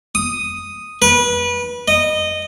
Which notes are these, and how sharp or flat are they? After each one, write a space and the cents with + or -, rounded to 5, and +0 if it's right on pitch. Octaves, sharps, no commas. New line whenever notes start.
D#6 +0
B4 -25
D#5 -15